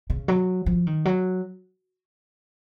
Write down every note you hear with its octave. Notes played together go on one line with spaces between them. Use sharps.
C#3
F#3
F3
D#3
F#3